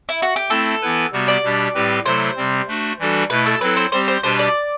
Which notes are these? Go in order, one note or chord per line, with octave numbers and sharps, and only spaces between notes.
E4
F#4
G4
A3 C4 E4 A4
E3 B3 E4 B4
C3 G3 B3 F#4
D5
B2 G3 D4 G4
A2 G3 C4 G4 B4
C3 F#3 A3 E4 A4 C5
C3 G3 C4
A3 D4 F#4
E3 G3 D4 F#4 A4
B2 A3 E4 B4
A4
F#3 C4 E4 A4 B4
C5
G3 C4 G4 C5
C5
B2 G3 D4 G4 B4 C5
D5